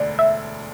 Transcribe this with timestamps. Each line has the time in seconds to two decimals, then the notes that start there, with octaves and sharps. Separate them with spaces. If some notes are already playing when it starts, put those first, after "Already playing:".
Already playing: E1 D2 D3 D5
0.19 E5